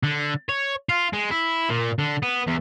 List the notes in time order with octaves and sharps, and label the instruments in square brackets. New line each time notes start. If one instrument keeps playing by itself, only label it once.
[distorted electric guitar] D3
C#5
F4
G#3
E4
A#2
D3
B3
E2